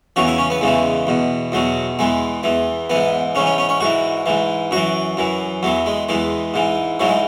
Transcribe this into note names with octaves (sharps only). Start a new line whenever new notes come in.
E2 C#3 E3 F#4
E4
C#4
B3
E2 C#3 E3 G#3
E2 B2
E2 B2 F#3
E2 E3 G#3
E2 E3
G#2 E3 B3
G#2 E3 C#4
C#4
C#4
C#4
G#2 E3 F#4
G#2 E3
F#2 E3 F#4
F#2 E3
E2 E3 F#3
G#3
E2 E3 G#3
G#2 E3
G#2 E3 F#3
G#3